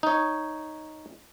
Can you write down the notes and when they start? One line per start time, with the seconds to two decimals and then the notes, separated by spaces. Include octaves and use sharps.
0.03 D#4 C#5